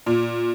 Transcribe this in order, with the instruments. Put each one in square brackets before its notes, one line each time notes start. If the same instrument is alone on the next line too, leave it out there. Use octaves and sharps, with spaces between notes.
[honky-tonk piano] A#2